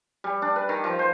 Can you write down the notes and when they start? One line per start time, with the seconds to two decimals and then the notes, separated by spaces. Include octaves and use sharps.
0.24 G3
0.42 D4
0.56 B4
0.69 D#3
0.84 F3
0.99 C5